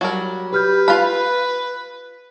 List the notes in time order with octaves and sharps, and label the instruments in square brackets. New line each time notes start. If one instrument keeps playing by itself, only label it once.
[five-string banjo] F#3 G3 A#4
[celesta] G4 F6 G6 [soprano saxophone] B4
[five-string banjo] F4 F5 B5 [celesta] F#6